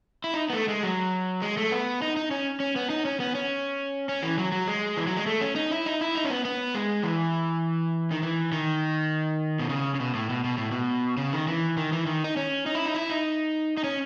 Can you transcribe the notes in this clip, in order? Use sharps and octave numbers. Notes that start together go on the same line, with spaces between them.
E4
D#4
B3
A3
G#3
F#3
G#3
A3
B3
D#4
D#4
C#4
C#4
B3
D#4
C#4
B3
C#4
C#4
E3
F#3
F#3
G#3
E3
F#3
G#3
A3
C#4
D#4
E4
D#4
E4
D#4
C#4
B3
B3
G#3
E3
D#3
E3
D#3
B2
C#3
C#3
B2
A2
B2
B2
A2
B2
C#3
D#3
E3
D#3
E3
D#3
D#4
C#4
D#4
E4
D#4
E4
D#4
D#4
C#4